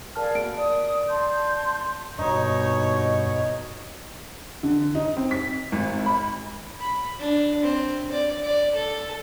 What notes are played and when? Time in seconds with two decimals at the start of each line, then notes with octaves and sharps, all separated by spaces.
0.16 G#4 A#4 D5 F5 A5 F6
0.35 A#3 F#4 D7
0.58 D5 D#6
1.07 A5 C6 G6
2.19 G2 B2 D#4 C#5
4.63 D3
4.95 D#4
5.17 C4
5.31 B6
5.72 G#1
6.06 B5
6.80 B5
7.19 D4
7.63 C4
8.12 D5
8.44 D5
8.75 A4